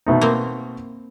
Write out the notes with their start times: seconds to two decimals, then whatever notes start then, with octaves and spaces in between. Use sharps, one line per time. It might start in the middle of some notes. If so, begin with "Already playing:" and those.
0.06 B2 A3 D#4
0.21 A#3 C4